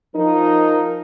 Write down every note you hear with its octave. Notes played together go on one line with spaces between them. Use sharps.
F3 D#4 A#4